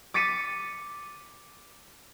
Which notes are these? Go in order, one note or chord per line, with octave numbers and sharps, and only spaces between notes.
D6 A6 B6 C#7 D#7